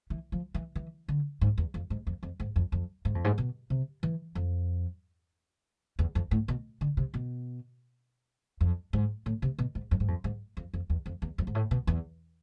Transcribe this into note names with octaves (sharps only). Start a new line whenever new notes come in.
E3
F3
E3
E3
D3
G#2
E2
F2
G#2
F2
F2
G#2
F2
F2
G#2
F2
G#2
B2
C3
E3
F2
E2
F2
A2
B2
D3
C3
B2
F2
G#2
A2
C3
B2
G#2
F2
G#2
F2
G#2
F2
F2
E2
F2
E2
F2
G#2
A2
B2
E2